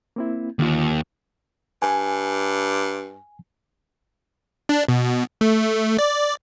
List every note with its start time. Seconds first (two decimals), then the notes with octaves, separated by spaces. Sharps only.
0.16 A#3 C4 E4
0.59 D#2 D3 F4
1.82 G2 G#5
4.69 D4
4.89 B2
5.41 A3
5.99 D5